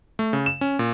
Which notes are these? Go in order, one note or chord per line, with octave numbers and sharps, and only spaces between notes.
A3
C#3
E7
C#4
A#2